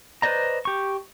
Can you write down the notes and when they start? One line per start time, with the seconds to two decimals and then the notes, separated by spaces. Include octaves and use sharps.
0.22 B4 C5 D5 D#5 A#5
0.65 G4 C#6